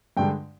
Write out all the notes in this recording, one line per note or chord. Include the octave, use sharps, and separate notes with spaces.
G2 D3 G#3 G5